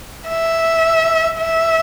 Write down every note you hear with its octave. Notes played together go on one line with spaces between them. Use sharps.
E5
E5